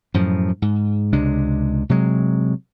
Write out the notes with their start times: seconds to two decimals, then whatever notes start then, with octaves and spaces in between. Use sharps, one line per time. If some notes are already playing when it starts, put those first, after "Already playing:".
0.14 F#2 A2 F3
0.62 G#2
1.13 C#2 C3 G#3 D4
1.89 C3 F#3 G#3